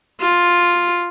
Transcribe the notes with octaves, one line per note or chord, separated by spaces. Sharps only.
F4